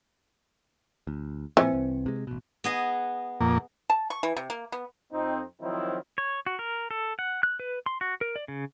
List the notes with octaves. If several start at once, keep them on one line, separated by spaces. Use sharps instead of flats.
D2
A#2 E3 F3 C4
C2
C3 G#3
A1 B2
B3 G#4 D#5
F2 A#2 A#3
A5
C#6
E3
C3
A#3
B3
F2 C4 D#4
D#3 F3 F#3 C4 D#4 E4
C#5
F#4
A#4
A4
F#5
F#6
B4
C6
F#4
A#4
D5
C#3